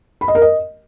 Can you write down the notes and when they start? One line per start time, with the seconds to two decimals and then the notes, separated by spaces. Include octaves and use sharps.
0.21 B5
0.28 D#5
0.35 A#4
0.42 D#5